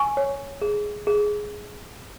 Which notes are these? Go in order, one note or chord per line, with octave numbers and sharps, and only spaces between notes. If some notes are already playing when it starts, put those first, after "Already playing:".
Already playing: G#5 C#6
C#5
G#4
G#4